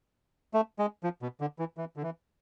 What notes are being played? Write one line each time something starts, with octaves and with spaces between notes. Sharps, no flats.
A3
G#3
F3
B2
D3
E3
E3
D3
E3